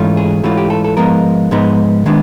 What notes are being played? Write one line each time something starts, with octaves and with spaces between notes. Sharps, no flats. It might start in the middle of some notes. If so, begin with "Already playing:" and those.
Already playing: G#2 E3 A3 C#4 F4
G#4
G#2 E3 A3 C#4 F4 F#4
G4
A4
A4
G#2 F3 G#3 B3 D#4 A#4
G#2 F3 G#3 B3 D#4
D#3 G#3 B3 D4